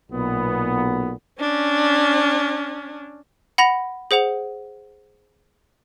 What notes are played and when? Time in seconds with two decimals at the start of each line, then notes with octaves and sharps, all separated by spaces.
0.11 B1 A#2 B3
1.40 C#4 D4
3.58 F#5 B5 A#6 F7
4.11 G#4 C5 F#5 F7